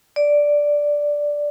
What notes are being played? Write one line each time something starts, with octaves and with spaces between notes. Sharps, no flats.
D5